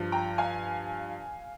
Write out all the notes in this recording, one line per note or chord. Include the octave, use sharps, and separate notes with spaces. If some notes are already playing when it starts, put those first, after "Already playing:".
Already playing: G2 F3
G5 A#5
F5 G#5